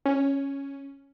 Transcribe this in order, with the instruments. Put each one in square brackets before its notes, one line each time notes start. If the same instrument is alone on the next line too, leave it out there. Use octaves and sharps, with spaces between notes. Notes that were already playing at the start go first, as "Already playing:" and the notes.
[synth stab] C#4